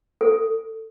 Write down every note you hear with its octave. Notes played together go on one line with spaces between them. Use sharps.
A4